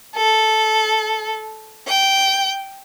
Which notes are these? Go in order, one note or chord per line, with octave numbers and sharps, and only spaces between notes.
A4
G5